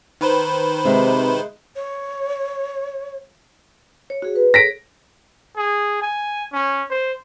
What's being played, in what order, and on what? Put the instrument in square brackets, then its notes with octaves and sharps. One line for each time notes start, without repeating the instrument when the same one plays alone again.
[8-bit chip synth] D#3 B4 C5
[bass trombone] C3 [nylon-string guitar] G#3 E5
[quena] C#5
[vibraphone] C#5
F#4 G#4
B4
[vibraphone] G#4 A4 C#5 [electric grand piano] A#6 B6 D7
[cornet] G#4
G#5
C#4
C5